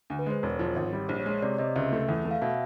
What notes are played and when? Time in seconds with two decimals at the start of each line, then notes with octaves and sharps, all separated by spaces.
0.10 D2
0.19 B4
0.26 G#3 C5
0.43 E1 C#5
0.59 F3
0.76 G#1
0.93 G3
1.09 A#1 C5
1.20 C#5
1.26 G#3
1.31 C#5
1.42 C3 D5
1.58 C3 D#5
1.76 C#2 E5
1.93 A3
2.09 E2
2.25 A3
2.31 F5
2.42 B2 E5